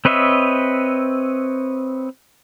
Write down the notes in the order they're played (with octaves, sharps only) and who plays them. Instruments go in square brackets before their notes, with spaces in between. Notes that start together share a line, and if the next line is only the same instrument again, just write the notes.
[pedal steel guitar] C4 B4 C#5 D#5 E5